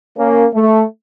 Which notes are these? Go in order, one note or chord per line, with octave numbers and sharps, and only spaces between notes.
A#3 C#4 A#4
A3